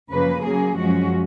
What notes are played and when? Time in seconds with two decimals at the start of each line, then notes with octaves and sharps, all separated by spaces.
0.10 F#2 C#3 F3 A#3 B4
0.43 C#3 F#3 A#3 C#4 G#4
0.76 F#2 F3 G#3 C#4 F#4